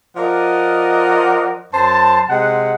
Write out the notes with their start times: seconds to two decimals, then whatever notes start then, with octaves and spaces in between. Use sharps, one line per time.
0.17 F3 A#4 D5 D#5 F#5
1.73 F#2 C5 A5
2.29 C3 G#3 F#5